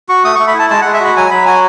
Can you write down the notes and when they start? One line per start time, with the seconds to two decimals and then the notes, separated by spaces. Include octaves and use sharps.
0.09 F#4 C#6
0.25 A3 D#6
0.35 A3 C#6
0.48 B5
0.54 E4 A5
0.70 G#3 A5
0.82 G#3 F#5
0.94 E5
1.00 F#4 B5
1.16 F#3 G#5
1.31 F#3 B5
1.46 F#4 G#5